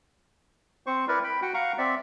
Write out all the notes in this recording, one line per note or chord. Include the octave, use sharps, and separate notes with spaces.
C4 C5 C#6
E4 A#4 B4 D5
G5 B5
F#4 F#5 G5
F5 F#5 A#5 C#6
C4 D5 E5